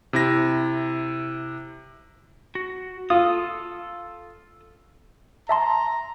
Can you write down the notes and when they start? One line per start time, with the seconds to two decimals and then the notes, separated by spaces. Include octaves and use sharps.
0.13 C3 E4 A#6
2.55 F#4
3.10 F4 A4 D#6
5.49 E5 A5 A#5 C6